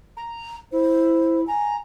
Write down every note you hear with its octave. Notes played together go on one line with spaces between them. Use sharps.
A#5
E4 C5
G#5 A#5